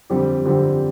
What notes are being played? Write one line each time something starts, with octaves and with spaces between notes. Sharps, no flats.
F2 D3 G3 C4 G4
F2 D3 G3 C4 G4